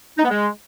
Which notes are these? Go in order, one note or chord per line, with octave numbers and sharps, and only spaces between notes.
D#4
B3
G#3